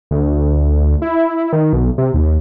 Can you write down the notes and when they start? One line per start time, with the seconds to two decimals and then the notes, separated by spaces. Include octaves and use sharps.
0.11 D2
1.02 E4
1.53 D#3
1.73 B1
1.98 C3
2.14 D#2